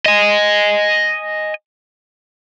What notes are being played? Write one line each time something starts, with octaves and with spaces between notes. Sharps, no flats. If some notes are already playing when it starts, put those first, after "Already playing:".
D#5 G#5